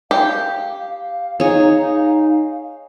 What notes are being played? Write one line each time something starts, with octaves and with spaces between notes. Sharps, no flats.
G4 F5
D#4 G#4 C#5